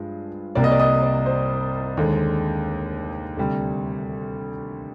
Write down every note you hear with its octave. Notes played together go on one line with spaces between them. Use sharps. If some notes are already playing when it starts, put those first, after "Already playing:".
Already playing: G2 F3 G#3
C2 C3 G3 A#3 D5
D#5
D5
D#5
D5
C5
D#2 D3 G#3
D2 C3 G3